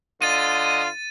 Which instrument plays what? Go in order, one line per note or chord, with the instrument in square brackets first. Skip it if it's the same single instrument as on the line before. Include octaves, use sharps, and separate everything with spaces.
[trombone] D3 [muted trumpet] F4 [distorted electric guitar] D#5 [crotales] A6 D#7